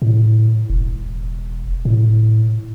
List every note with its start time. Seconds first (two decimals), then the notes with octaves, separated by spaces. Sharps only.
0.02 A2
0.70 E1
1.85 A2